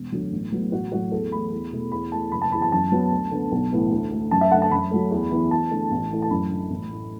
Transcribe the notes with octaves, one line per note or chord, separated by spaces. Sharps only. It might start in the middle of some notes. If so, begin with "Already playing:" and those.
Already playing: E1
D2 D3 F#3
A1
A2 F#3 B3
A1 F#4
A2 F#3 A3 F#4
E2 A4
E3 A3 B5
E2
B2 A3
E2 B5
E3 A3 A5
F#1 B5
A5
E2 E3 B5
A5
F#2 A5
F#3 B3
D2
D3 B3
B1
A2 E3 B3
D2
D3 A3
F#2 A5
E5
D3 A3 F#5
A5
F#2 B5
F#3 A3
E2
E3 B3
E2 A5
D3 A3
A1
A2 E3 A3
A5
F#2 B5
D3 A3
A1
A2 A3